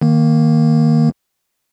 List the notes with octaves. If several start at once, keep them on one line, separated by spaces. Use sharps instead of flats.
D#3 A#3